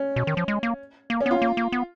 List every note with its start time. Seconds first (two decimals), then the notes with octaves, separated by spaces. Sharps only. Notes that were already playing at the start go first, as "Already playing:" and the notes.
Already playing: C#4
0.16 B2
0.27 D#3
0.37 F3
0.48 G#3
0.63 A#3
1.10 A#3
1.21 C#4
1.26 B3 F4
1.42 A#3
1.57 A#3
1.72 B3